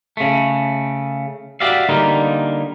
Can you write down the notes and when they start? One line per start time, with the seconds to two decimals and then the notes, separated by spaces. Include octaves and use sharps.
0.17 C#3 A3
1.60 F#4 G4 D5 E5 F5
1.89 D3 G3 A#3 D#4 F4